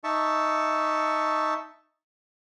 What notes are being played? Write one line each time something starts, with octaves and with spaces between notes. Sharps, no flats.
D#4 E5 A5 C#6